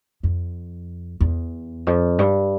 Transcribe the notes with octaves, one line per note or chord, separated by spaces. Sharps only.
F2
E2
F2
G2